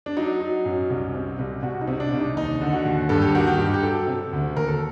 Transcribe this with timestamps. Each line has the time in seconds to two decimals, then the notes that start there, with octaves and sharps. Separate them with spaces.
0.06 D4
0.17 F#3 D#4
0.40 F#3
0.65 F#2
0.90 C2
1.14 C3
1.39 C2
1.63 C2 F#4
1.81 D#4
1.88 C3
2.00 D4
2.12 C2
2.18 D#4
2.36 D#2 D#4
2.61 D3
2.72 F#4
2.85 D#2
3.09 G2 A4
3.22 G4
3.35 D#3 F#4
3.47 G4
3.59 G2
3.74 G4
3.83 F#3 A4
4.07 C3
4.33 D2
4.57 D#2 A#4
4.68 A4